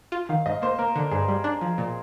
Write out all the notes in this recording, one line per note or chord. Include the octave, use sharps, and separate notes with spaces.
F4
D#3 F5
G#2 D#5
A#3 C5
A#3 A#4
D3
G2 G#4
G3
D4
F3
A#2